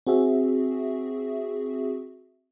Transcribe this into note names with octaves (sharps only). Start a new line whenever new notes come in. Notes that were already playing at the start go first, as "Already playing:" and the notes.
C4 F#4 G#4 E5